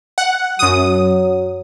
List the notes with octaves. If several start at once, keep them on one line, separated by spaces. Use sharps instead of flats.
F#5
F#2 F#3 D#6